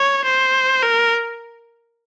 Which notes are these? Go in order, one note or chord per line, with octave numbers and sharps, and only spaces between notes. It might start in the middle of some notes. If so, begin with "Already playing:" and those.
Already playing: C#5
C5
A#4